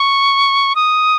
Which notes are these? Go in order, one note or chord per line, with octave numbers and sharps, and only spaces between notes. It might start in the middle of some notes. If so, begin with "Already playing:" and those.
Already playing: C#6
D#6